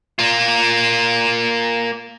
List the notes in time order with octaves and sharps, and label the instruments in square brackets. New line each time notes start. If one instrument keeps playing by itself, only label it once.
[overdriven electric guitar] A#3 F4